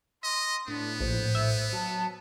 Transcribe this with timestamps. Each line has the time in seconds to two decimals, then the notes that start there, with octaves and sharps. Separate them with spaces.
0.23 D#5 C6
0.68 A2 B3 D4
1.00 A#1 C5
1.35 E5
1.73 F#3 A5